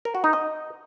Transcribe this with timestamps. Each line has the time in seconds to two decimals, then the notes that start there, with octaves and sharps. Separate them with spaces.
0.05 A#4
0.15 F#4
0.24 D#4
0.33 D#5